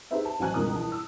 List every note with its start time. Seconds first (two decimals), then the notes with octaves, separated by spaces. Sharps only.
0.11 D#4 G4 G#4 B4 C5 E5
0.25 A5
0.39 A1 F#3 F#4 C5 G#5 F#6
0.54 C#2 G2 B2 E3 A#4 D#6
0.74 E3 A5
0.92 E6